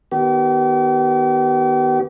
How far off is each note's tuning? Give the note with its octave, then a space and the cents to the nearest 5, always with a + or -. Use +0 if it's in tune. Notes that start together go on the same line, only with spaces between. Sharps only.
D#3 +0 B3 +0 G4 -40